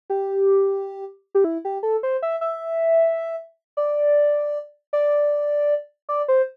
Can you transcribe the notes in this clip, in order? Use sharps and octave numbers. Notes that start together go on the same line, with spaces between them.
G4
G4
E4
G4
A4
C5
E5
E5
D5
D5
D5
C5